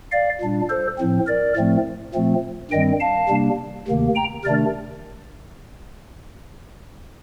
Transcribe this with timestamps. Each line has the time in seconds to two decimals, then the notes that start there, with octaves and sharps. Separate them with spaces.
0.12 D5 F5
0.40 A#2 G3 D4
0.70 A4 C5
0.98 A2 F3 C4
1.27 A#4 D5
1.56 A2 F3 A3 C4
2.14 A#2 F3 A3 C4
2.71 G2 D#3 G3 C4 D#5 G5
3.00 F5 A5
3.29 C3 G3 A#3 D4
3.87 D2 C3 D#3 A#3
4.16 G5 A#5
4.44 C3 D#3 A3 D4 A#4 D5